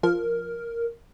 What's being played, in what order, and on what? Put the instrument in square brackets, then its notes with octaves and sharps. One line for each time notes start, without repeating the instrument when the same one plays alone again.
[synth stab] F3 [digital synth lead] A#4